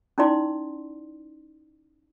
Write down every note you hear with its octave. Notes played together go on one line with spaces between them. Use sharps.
C#4 D#4 E4 D5 C6